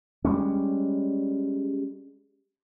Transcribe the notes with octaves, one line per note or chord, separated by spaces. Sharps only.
G3 G#3 C#4